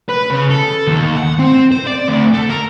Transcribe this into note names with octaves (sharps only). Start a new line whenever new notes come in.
B4
C#3
A4
D#2
F#5
C4
C5
D5
D2
A3
A#4